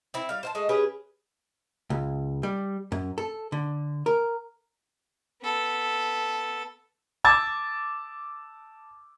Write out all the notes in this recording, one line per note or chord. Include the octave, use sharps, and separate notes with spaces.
C4 E4
G3 F5
C5 F5 A5
G#3 A3
C#4 G4 G#4 B4
C#2
G3
F#2
A4
D3
A#4
B3 A4
A5 D6 E6 G#6 A6